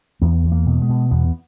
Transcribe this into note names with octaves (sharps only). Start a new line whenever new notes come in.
E2 B3
E2
A#3
B2
G#3
B2
E2 B3